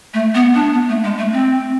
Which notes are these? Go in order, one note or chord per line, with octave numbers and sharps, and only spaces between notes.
A3
B3
D4
B3
A3
G#3
A3
C4